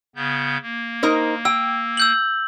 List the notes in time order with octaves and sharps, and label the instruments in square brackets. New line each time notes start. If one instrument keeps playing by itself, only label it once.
[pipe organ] C#3 B3 G6
A#3
[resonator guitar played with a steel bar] D#4 A#4 C5
[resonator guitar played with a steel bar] G5 [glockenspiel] E6
[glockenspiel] E6 G6 F#7